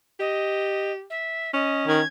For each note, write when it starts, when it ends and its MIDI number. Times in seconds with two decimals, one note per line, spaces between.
0.20 1.05 67
0.20 0.91 75
1.10 1.51 76
1.54 2.03 61
1.54 1.86 75
1.88 2.01 51
1.88 2.07 92